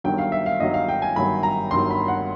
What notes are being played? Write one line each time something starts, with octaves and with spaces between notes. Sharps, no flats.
G1 G2 D#3 F#3 G5
F5
E5
F5
G1 G2 D#3 F#3 D#5
F5
G5
G#5
G1 G2 D#3 F#3 B5
A#5
G1 G2 D#3 F#3 C6
B5
F#5